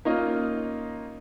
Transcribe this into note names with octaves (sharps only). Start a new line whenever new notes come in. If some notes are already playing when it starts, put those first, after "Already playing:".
A#3 C#4 D#4 F4 D#5